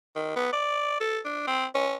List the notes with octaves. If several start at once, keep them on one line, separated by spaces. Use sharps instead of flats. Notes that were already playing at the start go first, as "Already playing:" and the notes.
D#3
B3
D5
A4
D4
C4
C#4